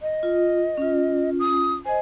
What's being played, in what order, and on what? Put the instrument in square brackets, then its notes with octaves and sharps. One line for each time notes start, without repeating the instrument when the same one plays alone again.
[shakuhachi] D#5
[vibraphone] F4
C#4 F4
[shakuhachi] D#6
[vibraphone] C5 D#5 [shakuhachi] G#5